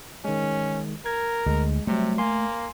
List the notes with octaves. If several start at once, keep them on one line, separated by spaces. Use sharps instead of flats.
D#3 G#3 C#4
A#4 G#6
D2 G#3
C3 F#3 G3 A3
A#3 G#5 C6